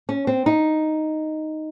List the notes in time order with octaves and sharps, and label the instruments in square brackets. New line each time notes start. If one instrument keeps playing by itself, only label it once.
[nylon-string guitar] C#4
C4
D#4